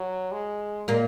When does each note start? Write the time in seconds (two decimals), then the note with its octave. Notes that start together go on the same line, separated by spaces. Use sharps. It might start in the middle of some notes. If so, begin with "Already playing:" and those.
Already playing: F#3
0.32 G#3
0.88 A#2 A#3